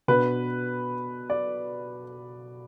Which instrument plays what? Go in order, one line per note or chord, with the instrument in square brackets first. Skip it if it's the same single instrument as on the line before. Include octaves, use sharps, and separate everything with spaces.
[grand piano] B2 B3 D4 B4
D5